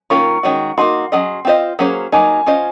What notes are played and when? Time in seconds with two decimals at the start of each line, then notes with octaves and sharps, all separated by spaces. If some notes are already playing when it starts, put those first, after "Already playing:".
0.10 D#3 A#3 C#4 F4 A#4 C#6
0.43 D#3 G#3 C#4 F#4
0.78 A#3 D#4 F#4 C6
1.12 F#3 C#4 G#4 D#5
1.45 C4 F4 C5 D#5
1.79 F#3 A#3 C#4 G#4 C5
2.12 F#3 A#3 D#4 G#5
2.46 C#4 F4 C5 D#5